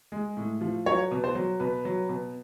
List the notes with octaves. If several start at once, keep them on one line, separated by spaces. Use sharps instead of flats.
G#3
A2
F3
F#3 C#5
B2
C5
F#3
B2 B4
F#3
B2